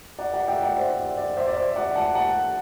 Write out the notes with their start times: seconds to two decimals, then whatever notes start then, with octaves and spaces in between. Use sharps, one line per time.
0.19 D5 F#5
0.33 D5 F#5
0.48 E5 G5
0.63 D5 F#5
0.78 C5 E5
0.98 D5
1.17 D5
1.37 C5 E5
1.47 D5
1.57 C5 E5
1.76 D5 F#5
1.96 F#5 A5
2.15 F#5 A5